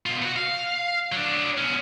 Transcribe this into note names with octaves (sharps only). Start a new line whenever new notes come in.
B2 F4
B3 F#4
F5
F#3 D4
B2 C#4